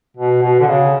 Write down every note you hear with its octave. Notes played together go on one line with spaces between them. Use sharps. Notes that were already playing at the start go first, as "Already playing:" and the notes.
B2
B2
D3
C#3